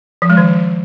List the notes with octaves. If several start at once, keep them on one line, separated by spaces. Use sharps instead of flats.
F3
G#3
D#3